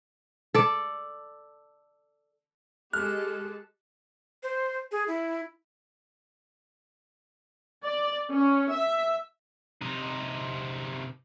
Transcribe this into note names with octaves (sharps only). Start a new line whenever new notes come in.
A4 D5
G#3 G4 A4 F6 F#6
C5
G#4
E4
D5
C#4
E5
C3 D#4